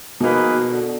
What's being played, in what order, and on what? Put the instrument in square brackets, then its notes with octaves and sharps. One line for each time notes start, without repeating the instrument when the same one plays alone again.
[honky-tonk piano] B2 [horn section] F3 A#3 D#4 G#4 B4
[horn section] D3